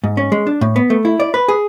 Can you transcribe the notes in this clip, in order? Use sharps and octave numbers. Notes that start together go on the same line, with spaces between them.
G#2
C#4
G#3
D4
A2
B3
A3
E4
D5
B4
G#4